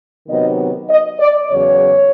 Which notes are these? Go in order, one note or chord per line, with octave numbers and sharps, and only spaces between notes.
C3 D#3 F#3 B3 D#5
D#5
D5
E2 C#3 F#3 C#5